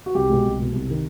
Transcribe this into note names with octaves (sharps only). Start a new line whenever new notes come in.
F#4
C2 G4
B2 G#3
C2
B2 G#3
C2
C3 D#3